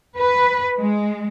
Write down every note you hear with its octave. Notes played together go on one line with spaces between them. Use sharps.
B4
G#3